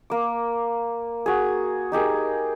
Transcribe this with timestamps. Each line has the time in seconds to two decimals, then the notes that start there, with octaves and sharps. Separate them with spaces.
0.10 A#3 D6
1.26 F#4 G#4
1.92 D#4 G4 G#4 A#4